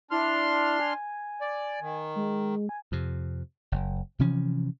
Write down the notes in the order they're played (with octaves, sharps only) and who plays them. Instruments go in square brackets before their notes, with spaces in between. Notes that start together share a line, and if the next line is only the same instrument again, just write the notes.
[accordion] D4 C6 F6 [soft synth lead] E4
[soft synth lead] G#5
[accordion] D5
D#3
[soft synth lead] G#3
G#5
[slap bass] F2 C3
F#1
C3 E3 F3 C#4